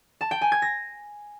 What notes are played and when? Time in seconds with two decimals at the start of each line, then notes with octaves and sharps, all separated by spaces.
0.21 A5
0.31 G5
0.41 G#5
0.52 G#6
0.62 A#6